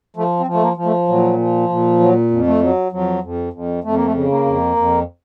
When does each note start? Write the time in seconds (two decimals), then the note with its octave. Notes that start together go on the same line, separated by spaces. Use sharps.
0.17 F3 A3
0.39 C4
0.46 F3
0.54 A3
0.62 A#3
0.77 F3
0.85 A3
1.08 A#2 F#3
1.38 F3
1.69 A#2
2.00 F#3
2.31 F2
2.47 A3
2.62 F#3
2.92 F2 F#3
3.23 F2
3.53 F2
3.84 F2 A3
3.95 A#3
4.05 A3
4.14 C#3
4.30 A#3
4.46 F2
4.76 F2